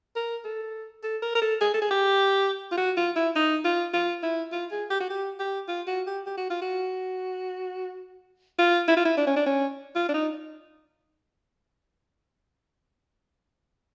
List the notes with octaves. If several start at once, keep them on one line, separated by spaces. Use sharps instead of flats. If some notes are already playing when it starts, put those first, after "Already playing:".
A#4
A4
A4
A#4
A#4
A4
G#4
A4
G#4
G4
F4
F#4
F4
E4
D#4
F4
F4
E4
F4
G#4
G4
F#4
G4
G4
F4
F#4
G4
G4
F#4
F4
F#4
F4
E4
F4
E4
D4
C#4
D4
C#4
F4
D4
D#4